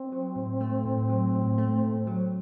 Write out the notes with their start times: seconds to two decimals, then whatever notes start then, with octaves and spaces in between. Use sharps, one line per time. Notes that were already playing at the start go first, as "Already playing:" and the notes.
Already playing: C4
0.12 F#3
0.36 A2
0.60 A3
0.85 A2
1.09 F#3
1.34 A2
1.58 A3
1.83 A2
2.07 F#3